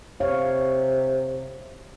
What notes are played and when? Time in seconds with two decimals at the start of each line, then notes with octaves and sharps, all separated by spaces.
0.20 C3 C#5 F5